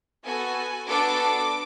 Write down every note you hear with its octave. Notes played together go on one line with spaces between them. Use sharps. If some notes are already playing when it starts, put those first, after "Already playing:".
B3 F#4 A4 G#5
B3 D4 F#4 A4 D6